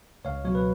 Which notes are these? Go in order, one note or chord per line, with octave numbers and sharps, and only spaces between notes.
C#2 C#5 F5
B2 F#3 C#5
B4